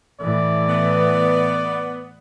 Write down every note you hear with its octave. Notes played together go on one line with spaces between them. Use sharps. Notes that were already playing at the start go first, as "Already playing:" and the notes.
A2 E3 D5
B3